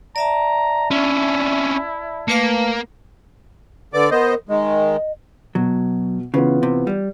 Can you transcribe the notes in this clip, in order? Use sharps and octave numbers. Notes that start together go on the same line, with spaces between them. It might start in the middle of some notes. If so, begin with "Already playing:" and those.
D5 E5 A5 A#5
C#4 D4 E4
A3 A#3 B4 F5
D3 B4 D5 D6
B3 A#4 C5 D#5
D#3 G#3 D#5
B2 F#3
C#3 E3 B3 F4
C3
G3